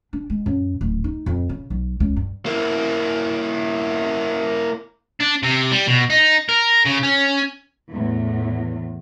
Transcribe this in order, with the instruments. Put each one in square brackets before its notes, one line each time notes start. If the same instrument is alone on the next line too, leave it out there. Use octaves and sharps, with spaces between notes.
[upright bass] D4
G#3
F#2
D1
D#4
F2
C#3
B1
C#2
G2
[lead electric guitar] A#3 E4
[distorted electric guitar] D4
C3
G3
B2
D#4
A#4
C#3
C#4
[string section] E2 A2